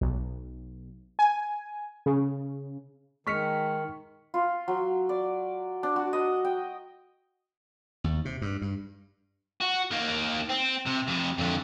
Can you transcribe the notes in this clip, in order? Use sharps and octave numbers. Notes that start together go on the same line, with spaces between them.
B1
G#5
C#3
D#3 G#3 C#6 F6 B6 C#7
F4
F#3
D5
D4
F#4
D#5
G5
D#2
C3
G2
G2
F#4
D#3 A#3
C4
C3
F2 C3
F2 D3